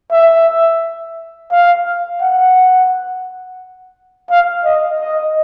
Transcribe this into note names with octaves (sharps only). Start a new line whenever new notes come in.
E5
F5
F#5
F5
D#5
D#5